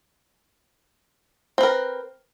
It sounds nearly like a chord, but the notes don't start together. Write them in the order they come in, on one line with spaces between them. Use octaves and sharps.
C4 B4 A#4